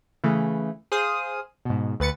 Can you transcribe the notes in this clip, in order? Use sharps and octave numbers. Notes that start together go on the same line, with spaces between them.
C#3 E3 A3
G#4 C5 F5 D#6
G#2 B2
D2 B4 A6 C#7